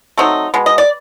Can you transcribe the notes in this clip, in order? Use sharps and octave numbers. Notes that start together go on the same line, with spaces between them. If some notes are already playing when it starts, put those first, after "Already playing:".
F#3 A3 C4 D#4
B2 G#3
D#5
D5